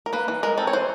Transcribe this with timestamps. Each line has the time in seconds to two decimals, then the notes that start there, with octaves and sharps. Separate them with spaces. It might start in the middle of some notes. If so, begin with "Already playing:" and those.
0.06 A#4
0.13 A#3 B4
0.28 E3
0.43 G#3 A#4
0.58 C4 A4
0.67 C#5
0.73 E3 C5